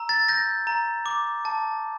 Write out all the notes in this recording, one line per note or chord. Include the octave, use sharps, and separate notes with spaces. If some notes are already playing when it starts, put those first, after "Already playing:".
Already playing: A#5 E6
A6
G6 A#6
A#5
D6
A5